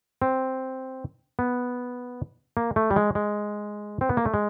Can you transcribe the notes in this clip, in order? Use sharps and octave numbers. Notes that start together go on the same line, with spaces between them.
C4
B3
A#3
A3
G3
G#3
G#3
C4
B3
A#3
A3
G#3